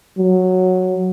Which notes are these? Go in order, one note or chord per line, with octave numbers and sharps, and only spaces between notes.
F#3